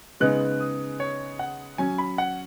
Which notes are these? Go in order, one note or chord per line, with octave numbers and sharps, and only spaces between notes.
C#3 G#3 B3 D#4 F#6
D#6
C#5
F#5
F#3 C#4 G#5
B5
F#5